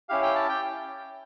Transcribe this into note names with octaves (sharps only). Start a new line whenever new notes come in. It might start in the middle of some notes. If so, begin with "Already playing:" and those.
C#4 E4 G4 F5
G5
A5
G5